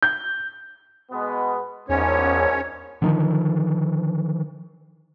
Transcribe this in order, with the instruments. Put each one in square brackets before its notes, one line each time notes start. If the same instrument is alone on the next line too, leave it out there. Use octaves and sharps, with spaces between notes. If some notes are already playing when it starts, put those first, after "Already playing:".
[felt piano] G6
[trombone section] B2 G#3 B3
[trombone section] A#1 G#2 [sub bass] E2 [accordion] C#4 C#5
[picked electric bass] D3 D#3 F3